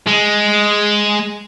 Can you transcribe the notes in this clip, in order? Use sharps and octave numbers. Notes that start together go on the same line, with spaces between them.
G#3